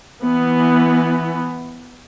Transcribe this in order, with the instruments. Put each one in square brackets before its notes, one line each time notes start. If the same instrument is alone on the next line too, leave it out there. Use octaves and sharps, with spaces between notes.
[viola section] E3 B3